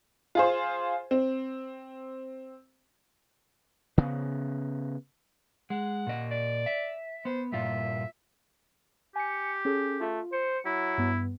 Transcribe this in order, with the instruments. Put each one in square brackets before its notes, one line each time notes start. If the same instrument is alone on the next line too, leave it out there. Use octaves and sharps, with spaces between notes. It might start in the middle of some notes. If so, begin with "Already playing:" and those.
[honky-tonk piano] F4 G#4 C5
C4
[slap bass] C#3 B3
[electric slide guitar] G#3 [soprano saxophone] F#5
[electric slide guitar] A#2 D#5
[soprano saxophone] D5
[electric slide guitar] E5
[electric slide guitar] B3 [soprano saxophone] C5
[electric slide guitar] G2 A#2 F4 [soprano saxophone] E5
[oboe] G4 [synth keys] G#5 C#7
[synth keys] C#4 G#4 A4
[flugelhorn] A3 [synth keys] F4
[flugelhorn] C5 [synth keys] C#7
[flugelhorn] F#3 [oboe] E4
[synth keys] G2 B3